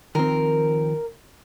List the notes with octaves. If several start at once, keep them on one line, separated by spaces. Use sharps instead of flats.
D#3 F3 C4 A#4